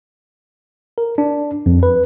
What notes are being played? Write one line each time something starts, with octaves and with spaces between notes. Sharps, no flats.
A#4
D4
F2
B4